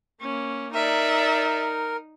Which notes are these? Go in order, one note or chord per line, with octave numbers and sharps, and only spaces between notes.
A#3 C#4
D#4 A#4 D5 E5